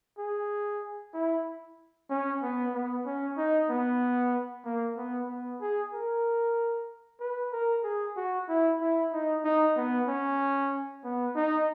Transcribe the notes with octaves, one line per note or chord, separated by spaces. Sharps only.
G#4
E4
C#4
B3
B3
C#4
D#4
B3
A#3
B3
B3
G#4
A#4
B4
A#4
G#4
F#4
E4
E4
D#4
D#4
B3
C#4
B3
D#4